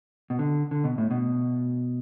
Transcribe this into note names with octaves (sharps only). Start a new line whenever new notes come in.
B2
D3
D3
B2
A2
B2